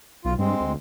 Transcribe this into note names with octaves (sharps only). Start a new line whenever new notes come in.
B1 F4
G2 G#3 C4
D2